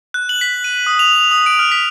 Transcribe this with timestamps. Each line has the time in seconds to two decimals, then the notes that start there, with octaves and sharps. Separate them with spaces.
0.14 F#6
0.29 F#7
0.41 B6
0.64 D#7
0.87 D#6
0.99 F7
1.16 F7
1.31 D#6
1.46 D7
1.59 F6
1.71 B6